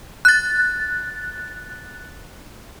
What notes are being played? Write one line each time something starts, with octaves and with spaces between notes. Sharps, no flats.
F#6 A6